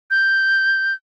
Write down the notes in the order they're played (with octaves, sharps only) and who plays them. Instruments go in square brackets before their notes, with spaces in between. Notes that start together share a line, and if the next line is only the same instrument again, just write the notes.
[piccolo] G6